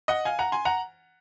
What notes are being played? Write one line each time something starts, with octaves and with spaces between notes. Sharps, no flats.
D#5 F#5
F5 G#5
F#5 A#5
G#5 C6
F#5 A#5